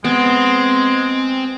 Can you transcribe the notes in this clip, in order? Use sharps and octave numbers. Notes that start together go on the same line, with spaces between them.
G#3 B3 C4